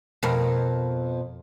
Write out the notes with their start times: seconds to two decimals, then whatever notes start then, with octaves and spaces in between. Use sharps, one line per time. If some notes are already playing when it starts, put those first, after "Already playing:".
0.23 F2 B2 A#4